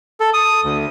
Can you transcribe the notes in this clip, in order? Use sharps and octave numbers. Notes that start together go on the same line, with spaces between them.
A4
D#6
D2